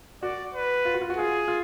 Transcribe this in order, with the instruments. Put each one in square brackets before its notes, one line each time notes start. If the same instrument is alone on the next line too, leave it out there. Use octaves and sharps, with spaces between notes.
[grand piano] F#4 [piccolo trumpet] D5
[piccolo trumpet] B4
[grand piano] F4
F#4
F4
F#4
[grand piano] F4 [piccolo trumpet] G#4
[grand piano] F4